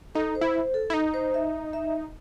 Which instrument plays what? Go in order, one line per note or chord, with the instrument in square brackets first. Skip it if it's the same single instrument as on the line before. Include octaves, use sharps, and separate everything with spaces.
[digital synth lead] D#4 [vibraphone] A4
[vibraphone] C5
[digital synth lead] E4
[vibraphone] C5
A4
[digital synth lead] E4
D#4
[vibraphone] C5
E5
E5